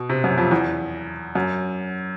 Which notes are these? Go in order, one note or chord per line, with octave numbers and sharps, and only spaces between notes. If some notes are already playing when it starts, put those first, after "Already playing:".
Already playing: B2
C3
F#2
F2
E2
F#2